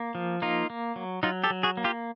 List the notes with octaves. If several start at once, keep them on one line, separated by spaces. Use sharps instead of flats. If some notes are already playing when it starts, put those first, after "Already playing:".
Already playing: A#3
F3
A#3 D#4 F4
A#3
F#3
F#3 D#4 F4
G4 A4
F#3
F#4 G#4
A#3
F4 G4